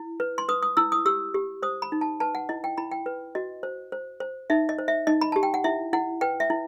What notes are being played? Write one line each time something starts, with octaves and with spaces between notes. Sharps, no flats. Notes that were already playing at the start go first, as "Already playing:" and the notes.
Already playing: E4
B4
C6
B4 D#6
D#6
E4 E6
D#6
G4 E6
G4
C5 D#6
B5
D#4
A5
B4 A5
F#5
E4 D#5
G5
E4 B5
G5
B4
F#4 D#5
C5
C5
C5
D#4 E5
D#5
C5
E5
D#4 D#5
B5
G4 A5
G5
F#5
E4 E5
E4 F#5
B4 G5
E5
E4